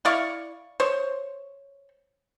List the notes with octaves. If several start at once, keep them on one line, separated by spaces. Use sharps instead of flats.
E4 D5 F5 C#6
C5 C#5